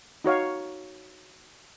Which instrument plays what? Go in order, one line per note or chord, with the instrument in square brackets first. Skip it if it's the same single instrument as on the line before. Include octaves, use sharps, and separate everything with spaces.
[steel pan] D#4 F#4 C#5 F5